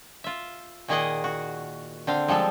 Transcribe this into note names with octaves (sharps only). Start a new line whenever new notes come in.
F4 E5
A#2 D#3 A#3 G#4 D#5 F#5
F#4
D3 C4 F5
F3 G3 G#3 A4